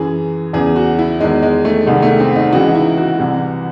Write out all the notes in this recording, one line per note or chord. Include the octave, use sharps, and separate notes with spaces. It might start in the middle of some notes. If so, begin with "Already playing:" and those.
Already playing: F#2 E3 G#4
E2 C#3 E3 G#4
F#4
E4
E2 D#3 G#3
G#3
A3
C2 C3 D#3 G#3
A3
C4
D#4
C#2 C#3 E3 F#4
D#4
E4
F#4
C2 C3 E3